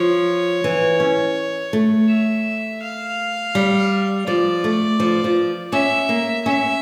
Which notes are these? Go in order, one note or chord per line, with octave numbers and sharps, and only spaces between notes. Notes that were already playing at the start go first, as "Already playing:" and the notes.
Already playing: F3 C#5
E3
C#4
A3
E5
F5
G3
F3 D5
A3
F3
F3
C#4 E5
A#3
C#4 E5